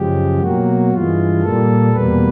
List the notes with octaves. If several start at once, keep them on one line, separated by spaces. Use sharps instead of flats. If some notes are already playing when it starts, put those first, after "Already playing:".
Already playing: F#2 C#3 F3 G#3 G4
B2 F#3 A#3 F#4
G2 E3 G#3 F4
A#2 G3 A#3 A4
E2 B2 G3 A#3 B4